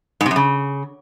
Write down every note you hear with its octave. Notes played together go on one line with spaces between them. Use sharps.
G#2
C3
F#2
C#3